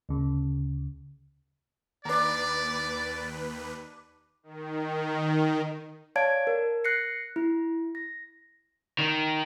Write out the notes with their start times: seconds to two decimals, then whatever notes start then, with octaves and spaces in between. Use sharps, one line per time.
0.09 D2 C#3
2.05 D#2 D4 B4 D5 A#5
4.43 D#3
6.16 C#5 D5 F5 A5 G#6 D7
6.47 A#4
6.84 F#6 A#6 C7 C#7
7.36 E4
7.95 A#6
8.99 D#3